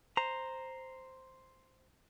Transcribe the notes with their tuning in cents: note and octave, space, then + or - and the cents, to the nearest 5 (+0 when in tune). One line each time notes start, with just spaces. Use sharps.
C5 +0 A#5 +0